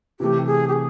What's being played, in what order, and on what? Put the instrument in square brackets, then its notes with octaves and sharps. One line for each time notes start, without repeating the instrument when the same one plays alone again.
[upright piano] C3 E3 A3 [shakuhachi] G4
[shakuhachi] G#4
G4
G#4